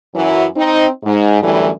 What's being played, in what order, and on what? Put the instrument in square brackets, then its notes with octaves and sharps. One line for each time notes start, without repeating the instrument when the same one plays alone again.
[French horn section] F#2 E3 F#3
C4 D#4
G#2
F#2 A2 D3 E3 G3